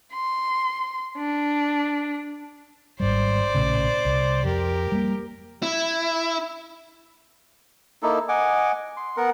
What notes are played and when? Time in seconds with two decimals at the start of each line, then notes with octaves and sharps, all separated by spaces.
0.13 C6
1.18 D4
3.00 G#1 G#2 G3 C5 D5
3.55 A#1 A2 C#3
4.05 C2
4.44 F2 G4 A#4
4.92 G3 A#3
5.63 E4
8.03 A#3 D#4 E4 A4
8.29 D#5 F#5 G#5 D6
8.97 C6
9.17 B3 A#4 F#5